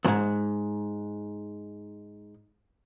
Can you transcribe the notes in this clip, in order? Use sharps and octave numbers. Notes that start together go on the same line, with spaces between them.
E2 G#2